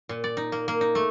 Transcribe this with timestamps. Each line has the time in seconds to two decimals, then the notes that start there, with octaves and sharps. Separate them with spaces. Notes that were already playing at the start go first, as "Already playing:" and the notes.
0.09 A#2
0.24 D5
0.37 D#4
0.52 A#3
0.68 A#3
0.81 D#4
0.95 A3